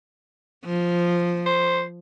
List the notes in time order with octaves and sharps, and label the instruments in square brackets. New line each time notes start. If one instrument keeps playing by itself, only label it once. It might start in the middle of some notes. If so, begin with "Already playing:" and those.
[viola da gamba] F3
[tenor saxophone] C5